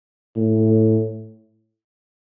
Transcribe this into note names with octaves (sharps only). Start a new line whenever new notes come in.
A2